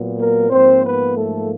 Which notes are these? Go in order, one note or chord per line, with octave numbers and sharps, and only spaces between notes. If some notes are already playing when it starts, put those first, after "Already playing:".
Already playing: A#2 F#3 B3
A#3 A#4
G#2 F3 A#3 C4 C5
B3 B4
A3 A4